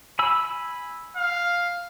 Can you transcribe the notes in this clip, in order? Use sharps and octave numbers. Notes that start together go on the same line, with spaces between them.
G#5 B5 E6
F5